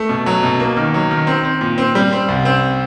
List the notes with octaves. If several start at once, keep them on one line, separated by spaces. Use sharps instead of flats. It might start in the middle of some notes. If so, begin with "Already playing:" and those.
Already playing: A3
B2
F#3
B2
A#3
D#3
F#3
D#3
C4
C4
A#2
C4
G3
C4
C2
C4